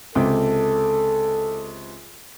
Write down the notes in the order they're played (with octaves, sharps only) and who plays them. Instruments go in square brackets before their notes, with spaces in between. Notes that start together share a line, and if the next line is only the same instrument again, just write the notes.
[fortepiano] C#2 C3 G5 [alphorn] A4